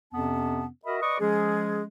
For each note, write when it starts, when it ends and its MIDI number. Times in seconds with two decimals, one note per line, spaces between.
0.13 0.66 41
0.13 0.66 48
0.13 0.66 59
0.13 0.66 61
0.13 0.66 81
0.85 1.00 66
0.85 1.00 70
0.85 1.00 75
0.85 1.00 76
0.85 1.00 83
1.01 1.18 71
1.01 1.18 74
1.01 1.18 75
1.01 1.18 85
1.01 1.18 87
1.20 1.84 53
1.20 1.84 56
1.20 1.84 61
1.20 1.84 68